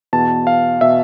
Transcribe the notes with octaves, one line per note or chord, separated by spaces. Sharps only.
E2 B2 A5
F5
B2 E5